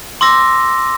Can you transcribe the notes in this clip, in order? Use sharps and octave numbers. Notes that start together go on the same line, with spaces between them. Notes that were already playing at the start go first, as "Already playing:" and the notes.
C6 D6 E6 A#6